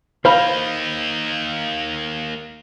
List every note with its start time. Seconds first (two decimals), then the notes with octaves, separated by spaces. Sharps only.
0.25 A#3 D#4 C5 F5 B5